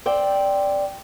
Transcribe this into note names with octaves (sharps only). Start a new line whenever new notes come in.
C4 D5 G5